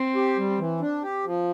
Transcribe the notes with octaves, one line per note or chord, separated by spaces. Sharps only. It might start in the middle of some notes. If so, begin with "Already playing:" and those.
Already playing: C4
G4
G3
E3
D4
G4
F3